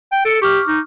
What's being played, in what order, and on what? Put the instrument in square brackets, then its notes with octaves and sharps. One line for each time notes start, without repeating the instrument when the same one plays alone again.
[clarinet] G5
[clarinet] A4 [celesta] C#7 D7
[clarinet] G4 [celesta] C#6 D6 F6
[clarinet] D#4